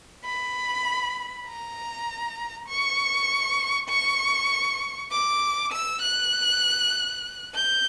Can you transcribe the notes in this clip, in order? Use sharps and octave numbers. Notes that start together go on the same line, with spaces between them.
B5
A#5
C#6
C#6
D6
E6
F#6
G6